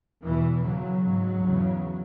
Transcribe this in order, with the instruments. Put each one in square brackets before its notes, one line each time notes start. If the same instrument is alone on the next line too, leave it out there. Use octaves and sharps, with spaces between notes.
[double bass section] E2 B2 E3
F#2 C#3 F#3
G#2
E2 C#3